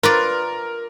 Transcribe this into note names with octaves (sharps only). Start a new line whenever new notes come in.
F4 A#4 B4 D5